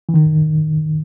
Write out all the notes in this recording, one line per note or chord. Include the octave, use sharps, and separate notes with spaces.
E3
D#3